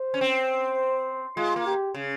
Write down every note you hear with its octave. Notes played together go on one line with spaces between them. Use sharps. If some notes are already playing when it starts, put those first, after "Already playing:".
Already playing: C5
C#4
C4
G#3 F4
A#3
G4
C#3